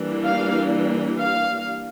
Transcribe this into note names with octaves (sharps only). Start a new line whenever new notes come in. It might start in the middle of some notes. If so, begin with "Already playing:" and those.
Already playing: E3 G3 A#3 D4
F5
F5